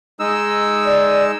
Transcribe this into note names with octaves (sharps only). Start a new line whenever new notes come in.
G#3 D#4 E6
D5